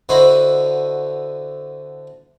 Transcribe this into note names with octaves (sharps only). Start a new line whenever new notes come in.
D3 E4 F#4 C5 D#5